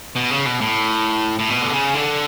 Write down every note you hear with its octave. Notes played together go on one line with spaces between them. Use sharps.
B2
C#3
B2
A2
A2
B2
D3
C#3
D3